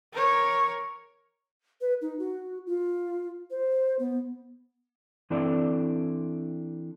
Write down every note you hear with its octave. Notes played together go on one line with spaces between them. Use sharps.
A#4 C#5
B4
D#4
F#4
F4
C5
B3
E3 C4 D4 E4 A4 D5